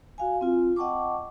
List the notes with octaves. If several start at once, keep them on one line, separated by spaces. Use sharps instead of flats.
F#4 F5 G#5
C4 F4
D#5 F#5 G5 A5 C#6 D6